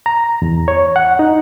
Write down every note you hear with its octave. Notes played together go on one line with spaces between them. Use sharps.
A#5
E2
C#5
F#5
D#4